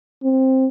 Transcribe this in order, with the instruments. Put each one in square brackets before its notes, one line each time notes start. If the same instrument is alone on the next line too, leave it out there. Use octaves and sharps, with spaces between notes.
[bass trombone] C4